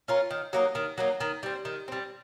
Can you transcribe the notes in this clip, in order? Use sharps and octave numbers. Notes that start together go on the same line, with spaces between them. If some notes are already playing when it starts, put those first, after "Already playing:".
C#4 F4 A#4
D#3
F#3 A#3 D#4
D#3
F#3 A#3 D#4
D#3
G3 C4
D#3
G3 C4